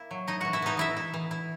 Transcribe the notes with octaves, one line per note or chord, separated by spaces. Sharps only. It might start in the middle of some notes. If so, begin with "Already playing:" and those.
Already playing: A#3 E4
F#3
D#4 E4 D#5
E3 F#4 F#5
E4 E5
B3 D#4 D#5
E3 E4 E5
E4
E3
E4